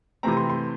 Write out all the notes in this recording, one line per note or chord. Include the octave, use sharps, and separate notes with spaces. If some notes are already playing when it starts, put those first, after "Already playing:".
C3 E3 A3 C4 A#5
C6
C6